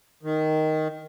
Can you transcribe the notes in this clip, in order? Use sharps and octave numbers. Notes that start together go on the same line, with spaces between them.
D#3